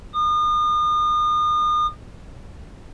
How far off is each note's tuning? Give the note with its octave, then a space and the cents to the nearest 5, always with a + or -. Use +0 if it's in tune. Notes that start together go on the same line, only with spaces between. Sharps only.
D#6 -40